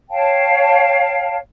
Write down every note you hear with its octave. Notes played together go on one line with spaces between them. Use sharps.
C#5 F5 G5 A5